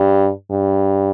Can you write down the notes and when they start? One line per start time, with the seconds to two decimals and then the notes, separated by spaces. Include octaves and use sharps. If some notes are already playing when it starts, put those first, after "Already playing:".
Already playing: G2
0.50 G2